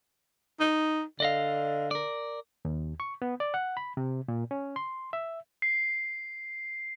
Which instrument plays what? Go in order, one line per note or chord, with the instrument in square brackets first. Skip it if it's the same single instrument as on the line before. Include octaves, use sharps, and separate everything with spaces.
[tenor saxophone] D#4
[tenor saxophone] D3 [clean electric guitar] D5 D#5 F5
[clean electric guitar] A#4 D5
[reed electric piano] D#2
C#6
B3
D5
F#5
B5
C3
A#2
C#4
C6
E5
[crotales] C7